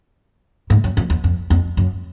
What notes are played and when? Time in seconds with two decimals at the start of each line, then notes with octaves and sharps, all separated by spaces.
0.70 G#2
0.84 F#2
0.97 F2
1.10 E2
1.24 F2
1.50 F2
1.77 F#2